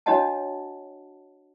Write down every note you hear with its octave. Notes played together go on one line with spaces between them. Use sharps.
D4 F#4 C#5 D#5 F#5 A5